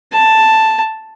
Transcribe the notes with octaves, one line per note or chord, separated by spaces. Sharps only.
A5